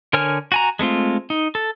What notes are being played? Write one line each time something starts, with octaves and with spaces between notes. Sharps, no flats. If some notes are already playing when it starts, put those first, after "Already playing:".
D3 A#4 C#5 G#5 F6
F#4 G#5 A#5
G#3 A3 C4 F4
D#4
A4